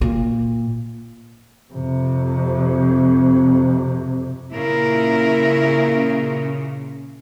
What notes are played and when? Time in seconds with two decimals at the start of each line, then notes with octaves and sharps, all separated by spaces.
0.01 A#2
1.73 F2 C3
4.54 A#2 C#3 E4 A#4